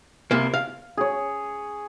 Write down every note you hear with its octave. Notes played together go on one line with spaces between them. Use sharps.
C2 C3 A#3
F5
G#4 C#5